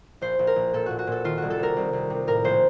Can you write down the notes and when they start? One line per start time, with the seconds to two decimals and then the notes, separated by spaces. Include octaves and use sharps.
0.21 A#1 C5
0.39 A#1
0.47 A#4
0.56 A#1
0.73 A#2 A4
0.86 A#2 F#4
0.99 F#4
1.07 A#2 A4
1.24 D#3 F4
1.38 C2 F#4
1.50 A4
1.59 C3 A#4
1.77 C2
1.93 C2
2.10 C3
2.27 A2 A#4
2.44 A#1 C5